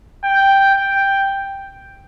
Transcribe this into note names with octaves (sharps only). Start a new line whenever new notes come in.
G5
G5